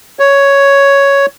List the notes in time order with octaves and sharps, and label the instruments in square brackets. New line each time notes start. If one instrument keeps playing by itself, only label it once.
[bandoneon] C#5